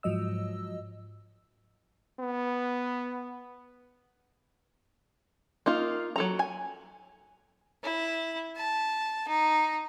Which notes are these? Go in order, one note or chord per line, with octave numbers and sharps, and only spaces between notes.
G#2 F3 F#3 D#5 E6
B3
A#3 D#4 F4
F#3 A4 A#5
G#5
E4
A5
D#4